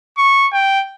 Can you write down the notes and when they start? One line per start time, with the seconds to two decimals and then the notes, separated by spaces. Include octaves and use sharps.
0.18 C#6
0.53 G5